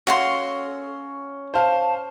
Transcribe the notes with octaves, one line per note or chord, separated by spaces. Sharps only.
C#4 F#4 A4 F5 C6
C5 F5 A5